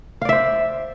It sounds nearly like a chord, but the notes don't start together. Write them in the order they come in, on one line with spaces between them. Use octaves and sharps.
F5 D5 E5 C5